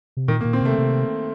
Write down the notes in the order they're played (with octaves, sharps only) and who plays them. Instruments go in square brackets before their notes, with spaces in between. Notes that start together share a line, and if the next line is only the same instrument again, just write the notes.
[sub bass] C3
[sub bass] A#2 [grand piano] D#3
[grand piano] A#3
[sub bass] A#2
[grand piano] C4
[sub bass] C3 [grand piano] A3
[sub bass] C3